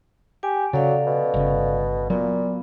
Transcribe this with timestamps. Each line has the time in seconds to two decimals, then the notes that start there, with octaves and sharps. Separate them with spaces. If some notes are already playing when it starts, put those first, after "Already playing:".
0.43 G4 G#5
0.73 C#3 F#3 A4 D5 F5
1.06 B2
1.34 G1 C#3
2.10 A#2 F#3 B3